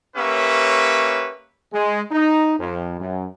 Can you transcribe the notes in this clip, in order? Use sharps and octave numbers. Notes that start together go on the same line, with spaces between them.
A#3 C#4 G4 B4 C#5 E5
G#3
D#4
F2
F#2